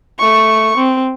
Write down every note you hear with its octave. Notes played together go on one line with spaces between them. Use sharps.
A3 C#6
C4